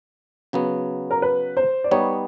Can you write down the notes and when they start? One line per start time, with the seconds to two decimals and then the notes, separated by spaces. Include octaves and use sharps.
0.53 C#3 F#3 B3
1.11 A#4
1.22 B4
1.57 C5
1.84 D5
1.91 G3 B3 D#4 C#5